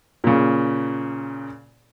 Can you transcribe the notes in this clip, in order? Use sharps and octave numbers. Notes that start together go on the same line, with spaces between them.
A#2 C#3